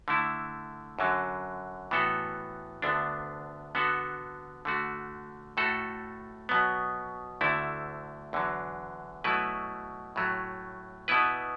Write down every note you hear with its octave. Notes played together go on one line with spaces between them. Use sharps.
D3 A3 E4
F#2 D3 F#3
A2 E3 B3 F#4 A4
D2 D3 B3 D4
D3 B3 F#4 A4
D3 A3 F#4
A2 A3 F#4 A4
B2 F#3 B3
D2 D3 A3 E4
E2 D3 F#3
B2 F#3 A3 E4 B4
A2 F#3 A3
B2 B3 E4 B4